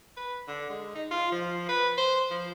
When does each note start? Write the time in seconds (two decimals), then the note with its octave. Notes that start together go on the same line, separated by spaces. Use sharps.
0.17 B4
0.48 D3
0.70 G#3
0.95 D#4
1.11 F4
1.32 F3
1.69 B4
1.98 C5
2.31 F3